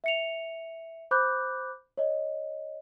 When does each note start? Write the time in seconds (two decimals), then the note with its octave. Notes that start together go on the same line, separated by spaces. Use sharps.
0.04 E5 C#7 F7
1.11 C5 B5 D6 F#6 G6
1.97 C#5 D#5